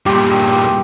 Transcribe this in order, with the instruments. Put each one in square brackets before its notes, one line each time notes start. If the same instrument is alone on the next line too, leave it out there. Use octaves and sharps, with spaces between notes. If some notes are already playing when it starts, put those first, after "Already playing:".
[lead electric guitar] G2 A#2 [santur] G4